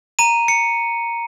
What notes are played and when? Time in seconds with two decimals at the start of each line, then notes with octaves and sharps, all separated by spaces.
0.19 A#5 D#7
0.48 C#7